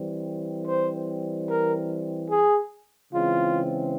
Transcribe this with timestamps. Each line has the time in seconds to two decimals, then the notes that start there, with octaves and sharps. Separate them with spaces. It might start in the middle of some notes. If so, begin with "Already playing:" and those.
Already playing: E3 G3 C4
0.67 C5
1.48 A#4
2.30 G#4
3.12 C#3 E3 G#3 C4 F4